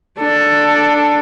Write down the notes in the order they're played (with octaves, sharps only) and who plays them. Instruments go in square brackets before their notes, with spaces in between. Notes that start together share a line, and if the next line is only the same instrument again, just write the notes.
[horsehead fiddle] D4 A4